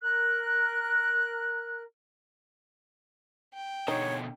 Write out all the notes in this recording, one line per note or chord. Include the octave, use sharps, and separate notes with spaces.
A#4 F#6
G5
B2 D3 D#4 C#5